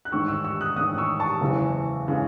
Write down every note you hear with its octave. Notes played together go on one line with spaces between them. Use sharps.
F#6
A1 G#2 D#3 C#6 E6
C#6 E6
C#6 E6
D#6 F#6
A1 G#2 D#3 D#6 F#6
C#6 E6
A5 C#6
F#1 E2 C#3 E3 G#3
C#3 E3 G#3